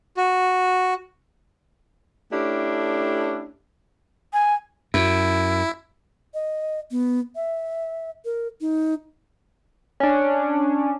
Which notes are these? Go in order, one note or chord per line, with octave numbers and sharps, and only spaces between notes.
F#4
A3 C#4 D4 E4 G4
G#5
F#2 E4
D#5
B3
E5
A#4
D#4
C#4 D4